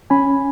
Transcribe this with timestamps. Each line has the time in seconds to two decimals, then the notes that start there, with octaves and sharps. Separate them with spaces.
0.10 C#4 G#5 B5